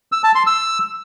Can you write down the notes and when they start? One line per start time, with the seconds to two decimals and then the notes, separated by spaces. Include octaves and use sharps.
0.12 E6
0.24 A5
0.35 C6
0.47 E6